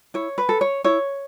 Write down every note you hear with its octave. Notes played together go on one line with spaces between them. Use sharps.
E4 C#5
B4
A4
C#5
E4 C#5